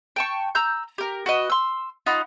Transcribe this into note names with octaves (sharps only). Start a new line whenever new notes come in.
G5 A5 C#6
A#5 E6 G6
G4 A#4
F#4 B4 D#5
C6 E6
D#4 F4 F#5 B5